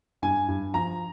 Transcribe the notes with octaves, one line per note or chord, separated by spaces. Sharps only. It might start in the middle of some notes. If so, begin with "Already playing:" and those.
G2 G#5
G2
F3 A#5